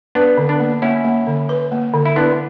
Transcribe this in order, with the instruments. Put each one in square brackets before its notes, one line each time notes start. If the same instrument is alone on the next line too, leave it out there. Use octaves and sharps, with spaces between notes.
[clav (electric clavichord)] B3 D4 [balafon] B4
[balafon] D3
[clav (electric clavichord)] B3 D4
[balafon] A#3
[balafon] A#3 [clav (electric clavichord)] C#4 E4
[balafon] A#3
D3
B4
A#3
D3
[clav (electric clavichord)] E4
[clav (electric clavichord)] B3 D4 [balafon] E4